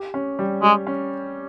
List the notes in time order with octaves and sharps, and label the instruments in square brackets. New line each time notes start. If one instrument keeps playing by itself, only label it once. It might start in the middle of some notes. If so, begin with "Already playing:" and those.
Already playing: [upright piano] G4
C#4
G3
[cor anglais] G#3 [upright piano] G4
[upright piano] C#4